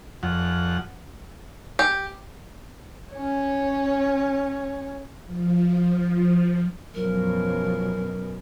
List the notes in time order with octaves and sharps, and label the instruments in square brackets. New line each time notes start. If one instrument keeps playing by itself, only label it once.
[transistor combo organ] F2 F#5
[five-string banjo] G4
[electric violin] C#4 C#5
[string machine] F3
[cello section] F#2 B2 [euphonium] F3 [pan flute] A#4